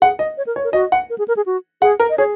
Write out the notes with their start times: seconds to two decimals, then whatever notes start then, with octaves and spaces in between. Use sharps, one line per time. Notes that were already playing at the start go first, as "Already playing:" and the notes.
0.02 G#4 F#5
0.19 D#5
0.37 C#5
0.47 A#4
0.56 C#5
0.64 A#4
0.73 F#4 D#5
0.92 F#5
1.10 A#4
1.18 G#4
1.28 A#4
1.37 G#4
1.46 F#4
1.82 G#4 F#5
2.00 A#4
2.10 D#5
2.18 G#4 C#5